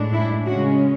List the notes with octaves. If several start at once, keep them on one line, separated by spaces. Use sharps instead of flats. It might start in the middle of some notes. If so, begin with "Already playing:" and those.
Already playing: A2 G#3 D4
E4
C#3 G#3 C#4 F#4